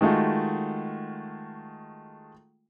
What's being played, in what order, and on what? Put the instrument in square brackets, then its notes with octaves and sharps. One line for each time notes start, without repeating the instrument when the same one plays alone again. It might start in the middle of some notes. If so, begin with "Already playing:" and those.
[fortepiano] D#3 G#3 A3 F4 F#4